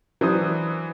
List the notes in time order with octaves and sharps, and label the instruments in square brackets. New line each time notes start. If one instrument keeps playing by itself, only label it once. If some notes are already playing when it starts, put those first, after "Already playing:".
[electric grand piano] E3 D#6 [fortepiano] F#3 D4 C5